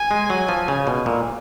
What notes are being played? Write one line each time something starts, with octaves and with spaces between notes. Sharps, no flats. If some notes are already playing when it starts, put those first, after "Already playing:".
Already playing: G#5
G#3
F#3
F3
C#3
B2
A#2